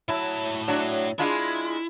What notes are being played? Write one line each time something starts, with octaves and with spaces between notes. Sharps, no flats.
A2 F#3 E4 A5
F#3 D4 F#4
G#3 D4 E4 F4